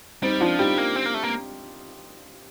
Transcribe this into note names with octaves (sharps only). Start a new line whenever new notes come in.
G3 C4 D#4
F3 D4 F4
G3 D#4 G4
A#3
C4
A#3
A3
A#3